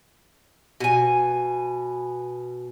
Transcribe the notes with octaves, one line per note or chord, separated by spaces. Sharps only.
B2 G#5